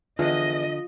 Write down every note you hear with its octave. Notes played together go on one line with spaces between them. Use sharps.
E2 D3 F4 D#5